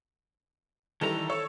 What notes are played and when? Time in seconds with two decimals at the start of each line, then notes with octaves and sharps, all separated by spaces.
1.01 D#3 E3 G3 A4 A#5
1.30 A4 C#5